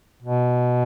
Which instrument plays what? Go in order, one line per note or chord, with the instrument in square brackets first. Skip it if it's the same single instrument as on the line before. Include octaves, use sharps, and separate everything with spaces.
[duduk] B2